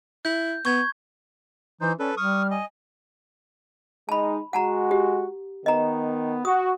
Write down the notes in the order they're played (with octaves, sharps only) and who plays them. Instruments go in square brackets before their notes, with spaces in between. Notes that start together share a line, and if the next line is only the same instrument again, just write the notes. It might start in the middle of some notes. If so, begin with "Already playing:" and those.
[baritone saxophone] E4 [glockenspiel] G6
[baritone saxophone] B3 [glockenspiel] C#6 G#6
[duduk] E3 [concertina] D#4 C5 [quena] G6
[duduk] C#4 [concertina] A4 B4 [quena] D5
[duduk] G3 [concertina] C#6 D#6 [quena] F6
[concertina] D#5 [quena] G#5
[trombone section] G#3 D#4 [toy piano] A5 B5
[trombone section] G#3 F#4 [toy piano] F#5 A5 A#5
[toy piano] G4
[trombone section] D#3 B3 [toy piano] D#5 A#5
[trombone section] F#4 [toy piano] D#6